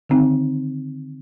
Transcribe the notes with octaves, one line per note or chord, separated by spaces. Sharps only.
D3 D#3 C4 D#4